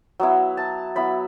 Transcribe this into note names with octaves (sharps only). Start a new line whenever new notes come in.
F#3 B3 E4
A5
F#3 B3 E4 B5